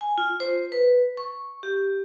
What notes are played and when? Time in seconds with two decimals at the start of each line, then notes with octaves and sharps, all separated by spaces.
0.01 G#5
0.18 F4
0.40 C5
0.72 B4
1.17 C#6
1.63 G4